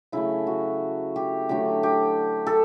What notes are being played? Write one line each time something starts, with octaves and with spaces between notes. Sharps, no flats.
C#3 F#3 A3 E4
F#4
G4
D3 F#3 A3 G4
G4
A4